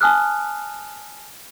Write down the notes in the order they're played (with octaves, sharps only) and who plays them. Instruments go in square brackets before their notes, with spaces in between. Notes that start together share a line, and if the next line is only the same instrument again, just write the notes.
[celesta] G#5 A5 D#6 F6 F#6